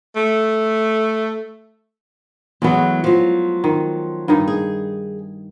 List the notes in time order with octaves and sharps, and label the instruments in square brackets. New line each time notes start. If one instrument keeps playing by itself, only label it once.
[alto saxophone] A3
[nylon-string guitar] E2 F#3 [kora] G#3 A3 B3
[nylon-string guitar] F3 F#3
[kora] D#3
G2 D#3 D#4
[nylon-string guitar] G#4